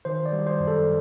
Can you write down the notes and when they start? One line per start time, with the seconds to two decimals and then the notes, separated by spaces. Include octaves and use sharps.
0.05 D#3 C5
0.26 D5
0.32 G3
0.47 C5
0.60 F#2
0.68 A4